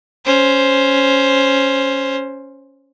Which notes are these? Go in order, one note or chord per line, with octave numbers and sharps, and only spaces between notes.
C#4 C5